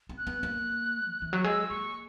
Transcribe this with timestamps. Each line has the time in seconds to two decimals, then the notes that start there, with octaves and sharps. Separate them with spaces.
0.09 B3
0.18 F#6
0.27 B3
0.43 A#3
1.10 D#3
1.22 E3
1.33 F#3
1.44 G#3 E6
1.69 A#3 C#6